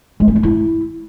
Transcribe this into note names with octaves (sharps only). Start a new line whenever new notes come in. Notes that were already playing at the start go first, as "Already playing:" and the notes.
G#3
C#4
D4
E4